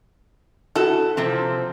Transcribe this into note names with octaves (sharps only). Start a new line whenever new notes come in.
E4 F#4 A4
C3 F3 C4